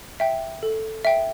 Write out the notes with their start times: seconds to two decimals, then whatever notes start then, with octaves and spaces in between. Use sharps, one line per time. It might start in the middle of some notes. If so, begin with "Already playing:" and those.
0.20 E5 G5
0.63 A4
1.05 E5 G5